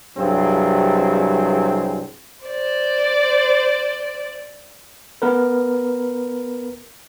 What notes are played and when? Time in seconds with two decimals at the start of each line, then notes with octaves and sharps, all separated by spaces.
0.18 C2 G2 F#3 C4 G#4
2.44 C5 D5
5.22 B3 A#4 B4